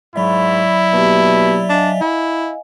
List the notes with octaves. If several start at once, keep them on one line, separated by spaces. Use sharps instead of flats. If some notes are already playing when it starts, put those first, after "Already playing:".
G#2 F#3 E4 D5 E5 B5 C#6
B2 A#3 G4
D4 D#5 F5 G#5
E4